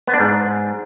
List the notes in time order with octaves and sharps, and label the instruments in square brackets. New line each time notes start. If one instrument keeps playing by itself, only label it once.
[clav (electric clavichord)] B3
D4
G#2